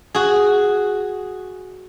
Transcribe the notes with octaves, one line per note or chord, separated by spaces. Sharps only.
F#4 G#4